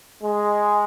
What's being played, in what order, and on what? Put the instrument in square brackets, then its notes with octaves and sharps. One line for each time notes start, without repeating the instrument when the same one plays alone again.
[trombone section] G#3